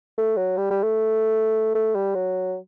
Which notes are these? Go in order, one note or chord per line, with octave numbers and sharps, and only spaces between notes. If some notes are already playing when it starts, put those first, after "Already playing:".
A3
F#3
G3
G3
A3
A3
G3
F#3